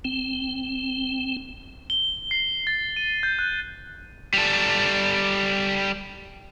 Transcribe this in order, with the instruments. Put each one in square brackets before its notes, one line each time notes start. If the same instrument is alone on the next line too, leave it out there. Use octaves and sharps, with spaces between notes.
[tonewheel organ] C4
[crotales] G7
C7
A6
D#7
G6
F#6
[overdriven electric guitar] G3 A4